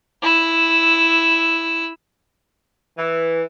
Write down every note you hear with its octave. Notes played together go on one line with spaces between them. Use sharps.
E4 E6
E3